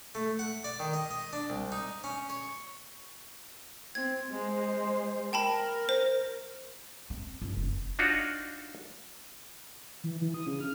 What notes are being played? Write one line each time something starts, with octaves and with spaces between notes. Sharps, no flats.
A3
F#5
D5
D#3
D#5
D#5
D4
C2
D#4
C#4
C#5
C4 G#6
G#3 C5
A#4 G5 A5 B5
C5
C4
G1
F#1
D4 D#4 F4 F#4 C#5
E3
E3
D#6
C#3
F6